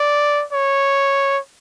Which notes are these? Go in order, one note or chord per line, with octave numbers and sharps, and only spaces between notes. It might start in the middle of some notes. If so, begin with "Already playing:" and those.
Already playing: D5
C#5